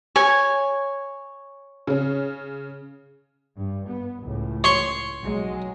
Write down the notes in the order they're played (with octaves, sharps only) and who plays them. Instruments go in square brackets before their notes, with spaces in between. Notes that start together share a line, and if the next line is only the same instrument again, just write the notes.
[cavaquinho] C#5 G#5
[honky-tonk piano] C#3 C#4
[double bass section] G2
B3
C#2 A2
[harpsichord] C#5 C6 C#6
[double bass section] B1 F#3 G#3